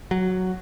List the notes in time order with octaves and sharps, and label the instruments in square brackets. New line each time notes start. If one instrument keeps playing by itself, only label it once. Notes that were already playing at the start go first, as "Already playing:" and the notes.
[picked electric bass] F#3